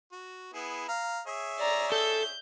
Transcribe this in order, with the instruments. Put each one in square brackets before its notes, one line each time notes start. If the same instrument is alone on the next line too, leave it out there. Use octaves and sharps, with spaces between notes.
[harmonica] F#4
B3 E4 G#4
F5 A#5
G#4 C#5 E5
[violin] D5 A#5
[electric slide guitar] A4 [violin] G6